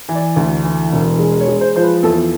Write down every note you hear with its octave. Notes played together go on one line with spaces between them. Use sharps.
E3
D5
D2
E3
E1
G#3
C#5
G#3
C5
F3 C5
B4
E2 A4